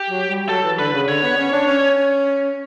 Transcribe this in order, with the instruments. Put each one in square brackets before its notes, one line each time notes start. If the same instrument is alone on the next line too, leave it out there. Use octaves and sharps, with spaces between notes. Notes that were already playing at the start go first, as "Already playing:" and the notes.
Already playing: [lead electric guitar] G4
[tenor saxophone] F#3
G3
[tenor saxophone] F#3 [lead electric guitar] A4
[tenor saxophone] E3
[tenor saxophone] D3 [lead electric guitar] B4
[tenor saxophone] C#3
[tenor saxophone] D3 [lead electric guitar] C#5
[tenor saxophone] B3
C#4
D4
C#4